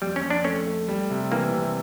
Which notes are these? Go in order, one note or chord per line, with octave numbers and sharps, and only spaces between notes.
F2 G3
C#4
F2
D4
A3 C#4
A3
G3
C3
E3 A#3
C3